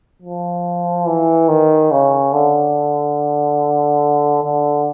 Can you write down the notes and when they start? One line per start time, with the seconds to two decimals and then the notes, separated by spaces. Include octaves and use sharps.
0.22 F3
1.06 E3
1.48 D#3
1.91 C#3
2.33 D3
4.44 D3